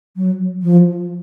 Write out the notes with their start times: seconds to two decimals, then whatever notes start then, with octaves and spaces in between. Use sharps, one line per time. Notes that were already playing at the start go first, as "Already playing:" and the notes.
0.16 F#3
0.62 F3